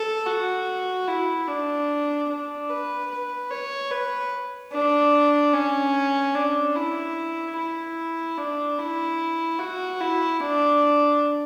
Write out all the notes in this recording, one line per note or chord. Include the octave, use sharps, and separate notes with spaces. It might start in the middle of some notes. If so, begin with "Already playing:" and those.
Already playing: A4
F#4
E4
D4
D4
B4
B4
C#5
B4
D4
C#4
D4
E4
E4
D4
E4
F#4
E4
D4